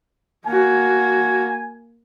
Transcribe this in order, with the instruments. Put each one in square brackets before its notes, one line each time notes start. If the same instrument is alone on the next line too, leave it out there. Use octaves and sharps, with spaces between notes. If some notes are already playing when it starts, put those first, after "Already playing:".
[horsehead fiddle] A#3 F#4 [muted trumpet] G#5